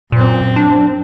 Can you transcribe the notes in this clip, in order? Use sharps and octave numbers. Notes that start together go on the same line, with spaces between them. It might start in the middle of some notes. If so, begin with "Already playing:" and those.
F#2 A#2 C4
D4